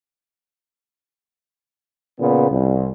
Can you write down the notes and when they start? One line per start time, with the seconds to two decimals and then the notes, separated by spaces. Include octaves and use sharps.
2.20 A#2 C#3 B3
2.50 C2